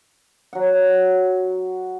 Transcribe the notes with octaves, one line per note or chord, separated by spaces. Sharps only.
F#3 F#5